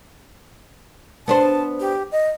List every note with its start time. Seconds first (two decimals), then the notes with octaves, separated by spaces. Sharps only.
1.28 B3 D4 C5 A5
1.80 G4
2.12 D#5